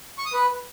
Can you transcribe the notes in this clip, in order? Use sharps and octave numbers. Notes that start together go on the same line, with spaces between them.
C#6
D#6
B4